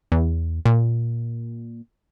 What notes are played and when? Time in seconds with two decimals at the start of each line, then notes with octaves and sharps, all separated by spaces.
0.12 E2
0.65 A#2